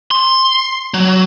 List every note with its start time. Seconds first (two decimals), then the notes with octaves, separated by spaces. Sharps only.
0.11 C6
0.94 F#3